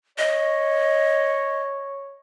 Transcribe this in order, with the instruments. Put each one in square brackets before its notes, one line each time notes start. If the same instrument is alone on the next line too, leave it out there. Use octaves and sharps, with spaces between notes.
[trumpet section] C#5 [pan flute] D#5